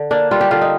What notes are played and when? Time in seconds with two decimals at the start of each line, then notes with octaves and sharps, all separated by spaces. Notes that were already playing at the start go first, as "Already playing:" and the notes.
Already playing: D3
0.11 A#3 D4
0.31 G3 F4
0.41 G4
0.51 D3 F4
0.61 D#4